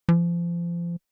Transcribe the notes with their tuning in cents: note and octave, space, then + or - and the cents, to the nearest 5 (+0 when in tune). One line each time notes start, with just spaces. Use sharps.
F3 -30